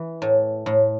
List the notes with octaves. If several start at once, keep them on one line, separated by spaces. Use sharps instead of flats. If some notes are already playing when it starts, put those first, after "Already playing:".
Already playing: E3
A2
A2